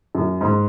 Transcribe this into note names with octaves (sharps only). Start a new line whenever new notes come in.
F#2
G#2